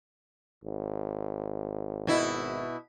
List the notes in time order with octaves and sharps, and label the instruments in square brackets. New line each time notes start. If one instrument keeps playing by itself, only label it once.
[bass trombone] G#1
[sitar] B2 E4